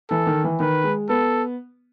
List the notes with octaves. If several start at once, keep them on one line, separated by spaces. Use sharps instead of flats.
E3 A4
D#3
E3
D#3 B4
G#3
B3 A4